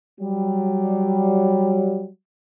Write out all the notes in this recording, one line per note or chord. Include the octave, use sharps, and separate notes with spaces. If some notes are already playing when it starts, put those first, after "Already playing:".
F#3 G3